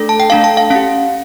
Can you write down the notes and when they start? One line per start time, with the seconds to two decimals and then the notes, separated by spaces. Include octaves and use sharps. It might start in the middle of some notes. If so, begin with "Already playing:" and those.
Already playing: A3 D4 A4
0.09 A5
0.20 G5
0.30 A3 D4 A4 F5
0.44 A5
0.57 F5
0.70 C#4 G4 F5